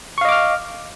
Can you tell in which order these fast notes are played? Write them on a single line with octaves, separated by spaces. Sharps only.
C#6 F5 D#5 D6 F6